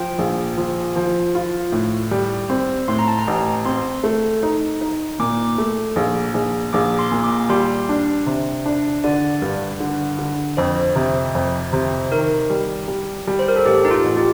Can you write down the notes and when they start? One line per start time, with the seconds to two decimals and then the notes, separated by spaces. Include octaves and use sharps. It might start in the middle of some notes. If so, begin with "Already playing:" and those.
Already playing: F3 G5
0.18 A#1
0.57 F3
0.96 F3
1.35 F4
1.72 A2
2.11 G3
2.50 C4
2.88 A2 C6
2.99 A#5
3.08 A5
3.19 A#5
3.27 A1
3.65 C4 C6
4.04 A3
4.43 D#4
4.81 D#4
5.19 A#2 D6
5.58 A3
5.96 A#1
6.34 A#1
6.73 A#1 D6
6.99 C6
7.12 A#2
7.24 D6
7.49 G3 C6
7.89 D4
8.26 C3
8.66 D4
9.04 D3 D5
9.42 G2
9.80 D3
10.19 D3
10.57 F2 C5
10.96 C3
11.35 F2
11.72 C3
12.12 D#3 A#4
12.50 G3
12.88 G3
13.27 G3
13.39 C5
13.48 A#4
13.56 A4
13.66 A1 G4
13.85 D#4
13.91 F4
14.04 A1
14.17 G4